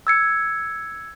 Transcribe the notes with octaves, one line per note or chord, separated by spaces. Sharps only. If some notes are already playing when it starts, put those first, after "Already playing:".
E6 G#6 C#7